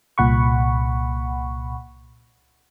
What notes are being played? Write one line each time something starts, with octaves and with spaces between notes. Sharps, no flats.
C2 A#2 F#5 B5 C#6